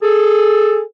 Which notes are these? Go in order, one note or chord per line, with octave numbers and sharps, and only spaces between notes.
G#4 A4